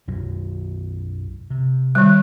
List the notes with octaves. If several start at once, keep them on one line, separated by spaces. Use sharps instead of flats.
B1 F#2 F#3
C3
D#3 G3